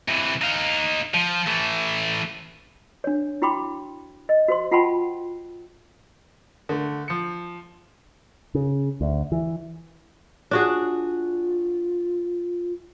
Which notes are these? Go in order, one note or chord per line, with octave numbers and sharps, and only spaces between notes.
C3 E3
D#4 F5
F3
E3 A3
D4 C#5
E4 F#4 G5 B5 C6 D6
D#5
F#4 C5 C6
F4 F#5 G5 A5 B5 C6
D3 A3
F3 C#7
C#3
D2
E3
D4 F4 F#4 G#4